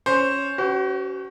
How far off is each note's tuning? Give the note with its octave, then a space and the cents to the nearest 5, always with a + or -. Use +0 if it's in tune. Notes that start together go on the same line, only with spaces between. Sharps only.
C#4 +0 C5 +0
C#4 +0 F#4 +40 B4 +35